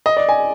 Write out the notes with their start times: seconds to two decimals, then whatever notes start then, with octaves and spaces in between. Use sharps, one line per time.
0.06 D#5
0.17 D5
0.29 G#5